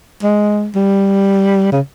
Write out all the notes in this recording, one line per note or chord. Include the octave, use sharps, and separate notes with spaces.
G#3
G3
C#3